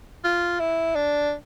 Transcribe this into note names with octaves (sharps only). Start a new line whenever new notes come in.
F4
E4
D4